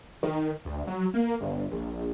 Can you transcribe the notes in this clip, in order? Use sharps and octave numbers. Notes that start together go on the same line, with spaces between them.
D#3
D2
F#3
A#3
G1
A#1